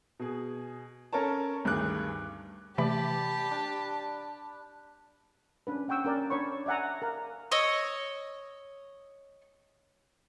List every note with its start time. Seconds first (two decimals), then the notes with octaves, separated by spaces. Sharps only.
0.19 B2 G#4
1.13 C#4 A4 A#4 C#5 A5
1.65 D2 G2 D#3 G#4 D6 F#6
2.78 C3 E3 A3 G4 D5 A5 B5
3.51 D4
5.67 C#4 D4 B4
5.88 C#4 F#5 G5 C#6 E6
6.05 C#4 A#4 D5
6.30 D4 C#5 B5 C#6
6.66 D5 E5 F#5 G#5 A#5
7.02 A#4 F5 A#5
7.51 C#5 D#5 E6